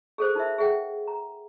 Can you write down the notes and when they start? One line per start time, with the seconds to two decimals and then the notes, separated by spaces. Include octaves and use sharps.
0.18 G#4 A4 C5
0.35 D#4 F4 A#4 C5 E5
0.58 G#4 E5 F#5 G5
1.07 A#5